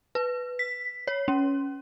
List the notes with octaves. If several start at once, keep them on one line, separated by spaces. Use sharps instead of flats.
B4
B6
C#5
C#4